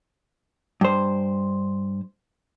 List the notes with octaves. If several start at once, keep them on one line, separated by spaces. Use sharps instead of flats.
G2 C5